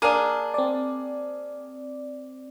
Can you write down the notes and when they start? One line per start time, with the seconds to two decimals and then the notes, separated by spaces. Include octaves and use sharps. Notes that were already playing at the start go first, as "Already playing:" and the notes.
0.02 A#3 D4 G#4 F6 D#7
0.54 C4 D5